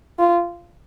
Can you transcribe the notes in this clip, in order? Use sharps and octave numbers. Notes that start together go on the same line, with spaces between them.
F4